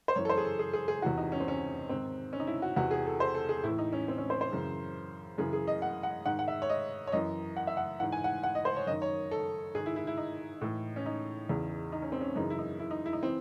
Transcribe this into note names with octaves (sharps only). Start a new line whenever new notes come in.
C5
F#2 E3 C#5
A4
C5
G#4
A4
G#4
G#4
G#4
E2 C3 E3 F#4
D#4
C#4
C4
C#4
G#2 D#3 C4
C#4
D#4
E4
F#4
E2 C3 E3 F#4
G#4
A4
C5
A4
G#4
A2 E3 E4
D#4
C#4
C4
C#4
C5
C5
F#2 C#3 E3
F#2 C#3 E3 G#4
G#4
D#5
F#5
F#5
G#2 D#3 F#5
F#5
E5
C#5
D#5
C#5
F#2 E3 D#5
F#5
E5
F#5
G#2 E3 F#5
G#5
F#5
F#5
D#5
C5
C#5
F#2 D#3 D#5
C#5
A4
G#2 D#3 G#4
E4
E4
E4
D#4
A2 E3
C#4
D#4
E2 C#3 E3
D#4
C#4
C4
C#4
F#2 C#3 E3 D#4
E4
D#4
E4
D#4
E4
D#4
E3 C4